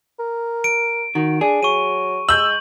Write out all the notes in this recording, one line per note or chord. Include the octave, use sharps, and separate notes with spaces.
A#4
D7
D#3 F#4
D4 G#4
F#3 C#6 D#7
G#3 E6 G6 F#7